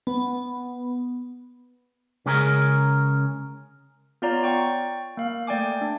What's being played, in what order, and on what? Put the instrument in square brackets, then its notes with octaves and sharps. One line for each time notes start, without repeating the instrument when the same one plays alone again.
[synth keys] B3
[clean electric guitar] C#3 G#3 C#4 G#4 A#4
[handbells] B3 F4 C#5 D5 F5 A#5
D5 G5 C#6
A#3 F5
A3 D5 G5 G#5 D6
D4